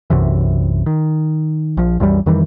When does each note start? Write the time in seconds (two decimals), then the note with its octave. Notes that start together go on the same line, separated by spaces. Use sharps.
0.10 B1 F#2 C3 E3
0.86 D#3
1.77 A#1 F3
2.00 C2 F#2 E3 G3
2.26 F2 D#3 E3 G3